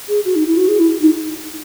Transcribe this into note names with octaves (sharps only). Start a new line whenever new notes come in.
G#4
F#4
D#4
E4
F#4
G#4
E4
D#4